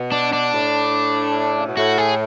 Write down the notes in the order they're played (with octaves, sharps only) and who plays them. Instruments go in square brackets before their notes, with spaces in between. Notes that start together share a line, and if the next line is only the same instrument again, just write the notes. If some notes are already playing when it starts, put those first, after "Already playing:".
Already playing: [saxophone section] B2
[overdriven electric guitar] D4
D4
[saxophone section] A2
C#3
B2
[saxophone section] A2 [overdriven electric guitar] F#4
[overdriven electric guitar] G#4